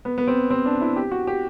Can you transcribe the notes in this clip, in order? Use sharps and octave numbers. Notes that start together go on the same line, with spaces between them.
B3
B3
C4
C4
D4
E4
G4
F#4
G4